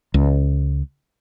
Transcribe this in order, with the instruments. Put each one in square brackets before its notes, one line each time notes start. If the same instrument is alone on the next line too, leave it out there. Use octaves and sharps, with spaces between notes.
[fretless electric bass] C#2